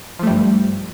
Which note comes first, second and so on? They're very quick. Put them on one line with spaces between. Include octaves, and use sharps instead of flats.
F3 A3 G3 G2